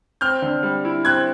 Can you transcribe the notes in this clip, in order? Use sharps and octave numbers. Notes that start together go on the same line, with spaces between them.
C4 F6 G6
D3
G3
E4
C4 F#6 G#6